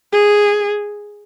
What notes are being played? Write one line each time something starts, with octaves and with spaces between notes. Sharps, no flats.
G#4